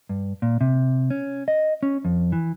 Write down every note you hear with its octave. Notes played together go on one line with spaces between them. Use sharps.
G2
A#2
C3
C#4
D#5
C#4
F2
E3